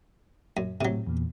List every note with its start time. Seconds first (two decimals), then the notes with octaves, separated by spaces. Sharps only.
0.57 F#2
0.81 A2 C3 F#3
1.07 E2 A#2